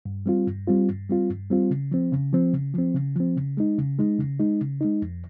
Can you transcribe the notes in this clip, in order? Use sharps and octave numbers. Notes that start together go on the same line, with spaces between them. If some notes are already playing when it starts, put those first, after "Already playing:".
G2
G3 C4 F4
G2
G3 C4 F4
G2
G3 C4 F4
G2
G3 C4 F4
C#3
F3 C4
C#3
F3 C4
C#3
F3 C4
C#3
F3 C4
C#3
G#3 D#4
C#3
G#3 D#4
C#3
G#3 D#4
C#3
G#3 D#4
F2